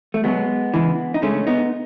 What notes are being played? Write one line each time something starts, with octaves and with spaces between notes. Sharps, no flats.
A3
B2 F#3 G#3 B3
C#3 E3 G#3
D#4
C#3 G#3 A3 C#4
B3 D#4